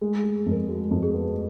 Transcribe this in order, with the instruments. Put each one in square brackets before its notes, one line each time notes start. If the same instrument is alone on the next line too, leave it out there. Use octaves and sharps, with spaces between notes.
[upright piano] G#3 [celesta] G#4
[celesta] G#4
[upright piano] G#3
[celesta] G#4
[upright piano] F2
[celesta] A#4
[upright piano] G#3 [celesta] F#4
[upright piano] F2
[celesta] G#4
[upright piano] B3